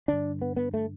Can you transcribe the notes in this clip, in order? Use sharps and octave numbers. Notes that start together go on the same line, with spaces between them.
G2 D3 D4
B3
B3
A3